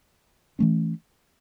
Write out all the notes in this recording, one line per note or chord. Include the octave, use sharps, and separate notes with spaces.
E3 A3 C#4